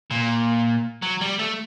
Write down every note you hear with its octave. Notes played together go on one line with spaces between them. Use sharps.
A#2
F#3
G3
A3